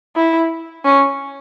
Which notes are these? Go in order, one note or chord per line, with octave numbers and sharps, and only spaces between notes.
E4
C#4